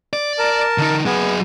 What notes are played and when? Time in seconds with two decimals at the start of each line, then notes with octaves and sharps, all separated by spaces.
0.13 D5
0.39 A#4 A5
0.78 D3 D#4
1.06 F#3 B3 G#4